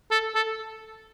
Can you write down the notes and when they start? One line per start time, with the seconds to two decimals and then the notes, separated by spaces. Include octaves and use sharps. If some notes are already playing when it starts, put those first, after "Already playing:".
0.11 A4
0.35 A4